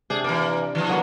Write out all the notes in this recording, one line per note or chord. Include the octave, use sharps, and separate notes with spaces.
C3 D4 G#4
E3 A#3 D5
D#3 F3
F#3 A#3 B3